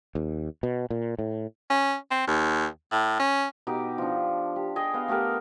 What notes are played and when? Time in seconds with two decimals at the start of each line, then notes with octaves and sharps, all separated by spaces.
0.15 D#2
0.63 B2
0.90 A#2
1.19 A2
1.70 C#4
2.11 C4
2.27 D#2
2.91 A2
3.19 C#4
3.67 B2 D#4 G4 D6
3.98 F3 D4
4.56 G4
4.76 G#4 D#5 G5 G#5
4.94 B3 F5
5.08 A3 B3 G4 A#4